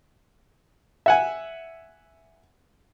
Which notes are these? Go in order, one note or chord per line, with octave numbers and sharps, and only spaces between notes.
E5 F#5 G#5